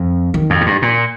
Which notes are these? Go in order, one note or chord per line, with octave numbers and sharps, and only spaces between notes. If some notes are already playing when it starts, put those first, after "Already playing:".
Already playing: F2
D#3
F2
G#2
G2
A#2